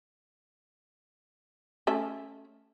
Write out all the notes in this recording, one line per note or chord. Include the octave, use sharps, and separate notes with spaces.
A3 C#4 E5